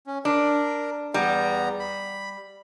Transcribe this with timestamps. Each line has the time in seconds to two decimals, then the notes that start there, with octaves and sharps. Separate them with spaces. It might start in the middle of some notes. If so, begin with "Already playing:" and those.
0.07 C#4
0.25 D4 A#4
1.14 E2 G3 B3 A#5
1.80 B5